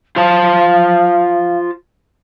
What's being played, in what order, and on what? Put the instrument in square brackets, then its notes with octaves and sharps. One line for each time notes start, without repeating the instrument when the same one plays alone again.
[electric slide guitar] F4 C5 A5 [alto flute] F5